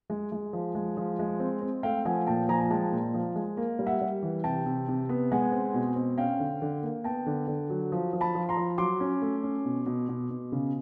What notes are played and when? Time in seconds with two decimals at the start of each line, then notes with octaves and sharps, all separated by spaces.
0.10 G#3
0.32 G#3
0.53 F3
0.75 G#3
0.97 F3
1.19 G#3
1.40 C4
1.62 C4
1.83 A3 F5 G5
2.05 F3 F#5 G#5
2.27 A#2 G5 A5
2.49 F3 G#5 A#5
2.61 A#5
2.71 G#3 G5 A5
2.92 A#2
3.14 F3
3.36 G#3
3.57 A#3
3.79 G3
3.86 E5 F#5
4.01 G3
4.23 E3
4.44 C3 G5 A5
4.66 C3
4.88 C3
5.09 B3
5.32 G#3 F#5 G#5
5.52 C4
5.74 B2
5.96 C4
6.18 C#4 F5 G5
6.40 D3
6.62 D3
6.83 A#3
7.04 B3 G5 A5
7.26 D3
7.48 D3
7.70 F#3
7.92 F3
8.13 F3
8.21 A5 B5
8.35 F3
8.49 A#5 C6
8.57 F3
8.78 F#3 C6 D6
9.00 C#4
9.22 A3
9.43 C#4
9.65 B2
9.86 B2
10.09 B2
10.30 B2
10.52 C#3